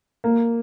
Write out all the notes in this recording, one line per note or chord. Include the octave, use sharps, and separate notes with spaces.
A#3